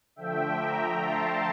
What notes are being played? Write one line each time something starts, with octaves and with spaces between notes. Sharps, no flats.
D3 F3 A3 E5 G5
G5 A#5
A5 C6